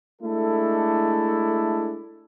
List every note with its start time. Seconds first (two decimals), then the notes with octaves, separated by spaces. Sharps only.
0.22 G#3 A3 D4 E4 A4